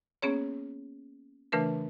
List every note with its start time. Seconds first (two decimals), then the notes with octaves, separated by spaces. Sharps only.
0.22 A#3 B3 C#4 G#4 C#5
1.52 C#3 E3 A3 D4 A#4 B4